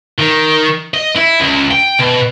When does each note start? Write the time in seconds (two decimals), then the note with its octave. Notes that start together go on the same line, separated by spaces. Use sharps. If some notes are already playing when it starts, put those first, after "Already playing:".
0.19 D#3
0.94 D#5
1.16 E4
1.40 C#2
1.71 G5
1.99 B2